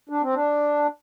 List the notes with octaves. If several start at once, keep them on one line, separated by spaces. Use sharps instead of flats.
D4
C4
D4